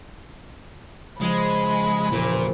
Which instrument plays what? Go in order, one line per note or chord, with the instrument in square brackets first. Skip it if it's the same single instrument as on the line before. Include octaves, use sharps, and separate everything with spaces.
[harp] C#3 F3 [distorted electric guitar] G#3 [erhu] B5
[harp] E1 A#1 E2 [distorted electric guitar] A#2